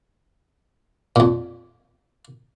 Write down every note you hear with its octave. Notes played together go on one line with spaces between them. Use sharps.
F2 A#2